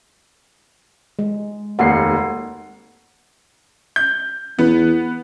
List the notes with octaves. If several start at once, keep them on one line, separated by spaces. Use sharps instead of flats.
G#3
F1 D#2 F#5 C7
G6
E2 B3